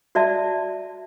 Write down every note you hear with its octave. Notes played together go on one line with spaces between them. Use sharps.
F#4 D5 E5 A5